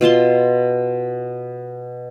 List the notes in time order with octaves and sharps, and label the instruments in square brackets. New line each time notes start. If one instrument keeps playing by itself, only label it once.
[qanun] B2 F4 A5 C6